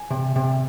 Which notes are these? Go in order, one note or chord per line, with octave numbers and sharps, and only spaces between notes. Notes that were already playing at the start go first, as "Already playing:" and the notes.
Already playing: G#5
C3
C3